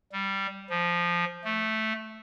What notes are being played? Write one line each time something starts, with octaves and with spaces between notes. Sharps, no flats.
G3
F3
A3